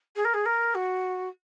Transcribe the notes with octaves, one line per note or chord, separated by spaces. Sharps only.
G#4
A#4
G#4
A#4
F#4